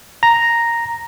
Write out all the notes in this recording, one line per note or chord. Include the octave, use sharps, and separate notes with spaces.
A#5